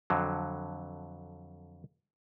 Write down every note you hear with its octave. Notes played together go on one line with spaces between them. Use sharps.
F2 D3 F#3